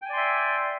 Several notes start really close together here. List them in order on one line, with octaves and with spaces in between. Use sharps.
G5 G#5 D5 C6 E5